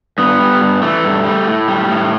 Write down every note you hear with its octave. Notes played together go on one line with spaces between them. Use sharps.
G2 B3
G3
G2
E3 A3
G2
G3
A2
G3
A2